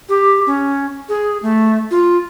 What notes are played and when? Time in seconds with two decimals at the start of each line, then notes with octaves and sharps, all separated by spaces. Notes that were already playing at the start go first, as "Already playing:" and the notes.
0.09 G4
0.47 C#4
1.09 G#4
1.42 A3
1.91 F4